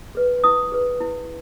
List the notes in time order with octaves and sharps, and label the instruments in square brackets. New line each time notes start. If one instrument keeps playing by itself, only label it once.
[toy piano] G#4 B4
E4 D#6
G#4 B4
E4